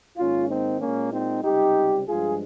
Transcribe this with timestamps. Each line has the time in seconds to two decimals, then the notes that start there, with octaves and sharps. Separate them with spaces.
0.17 G#2 D#3 A#3 C#4 F4
0.49 C4 D#4
0.80 A#2 G#3 A#3 C#4
1.12 C4 D#4
1.43 C#2 C3 G3 D#4 G4
2.07 G2 F3 G#3 F4 G#4